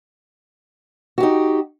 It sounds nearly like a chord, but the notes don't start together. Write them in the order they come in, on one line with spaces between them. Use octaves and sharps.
F#4 G4 D#4